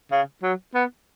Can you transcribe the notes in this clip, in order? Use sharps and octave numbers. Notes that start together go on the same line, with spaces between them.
C#3
F#3
B3